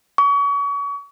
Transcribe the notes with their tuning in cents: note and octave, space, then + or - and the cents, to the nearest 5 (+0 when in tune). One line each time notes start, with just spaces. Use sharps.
C#6 +35